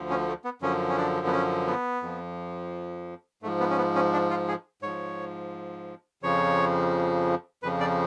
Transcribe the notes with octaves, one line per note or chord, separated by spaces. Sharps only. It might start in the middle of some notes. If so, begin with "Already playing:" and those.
Already playing: D2 D3 F3
C#4
A3
B3
F#2 D3 F3 C#4
C#4
D4
B3
C#4
B3
F2 F3
G#2 F3 A3
B3
C#4
B3
C#4
D4
F4
G#4
G#2 F3 C#5
F2 C#3 F3 C#5
F2 C#3 F3 B4
D5